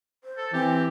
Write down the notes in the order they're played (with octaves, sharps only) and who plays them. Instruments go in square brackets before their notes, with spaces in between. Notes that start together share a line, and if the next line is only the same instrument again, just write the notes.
[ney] C5
[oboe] A4
[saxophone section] E3 [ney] C4 [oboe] G4